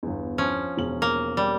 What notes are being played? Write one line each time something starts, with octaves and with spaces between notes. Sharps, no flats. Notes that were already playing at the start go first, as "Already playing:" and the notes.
G1 E2
F3 C#4
E1 F#7
A#3
G3